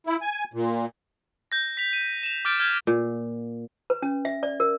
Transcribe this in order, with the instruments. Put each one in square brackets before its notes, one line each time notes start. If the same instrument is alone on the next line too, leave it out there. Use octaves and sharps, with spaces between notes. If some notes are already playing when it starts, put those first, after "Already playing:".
[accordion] E4
G#5
A#2
[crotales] G6 A#6
B6 F7
D#7
E7 F7
D6 F6 G6 A6 D7
F6 G6 G#6
[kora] A#2
[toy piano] B4
C#4
E5
D5
A#4